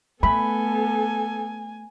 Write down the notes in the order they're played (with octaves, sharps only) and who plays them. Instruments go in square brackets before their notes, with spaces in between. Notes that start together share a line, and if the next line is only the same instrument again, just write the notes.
[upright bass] A3 [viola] B3 A4 [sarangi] G#5 [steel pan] B5